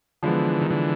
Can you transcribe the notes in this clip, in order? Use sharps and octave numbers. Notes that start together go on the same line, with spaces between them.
D3 E3 F3 G#3 B3
D#3
D3 E3